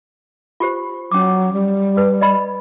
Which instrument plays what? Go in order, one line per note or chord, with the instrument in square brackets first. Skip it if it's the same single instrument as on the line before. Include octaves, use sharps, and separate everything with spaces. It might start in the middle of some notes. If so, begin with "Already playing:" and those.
[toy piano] F4 G4 C5
[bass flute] F#3 [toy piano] C#4 D6
[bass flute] G3
[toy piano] B4
D5 D#5 B5